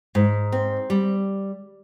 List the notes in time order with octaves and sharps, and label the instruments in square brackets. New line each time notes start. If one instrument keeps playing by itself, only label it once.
[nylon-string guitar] G#2
C4
G3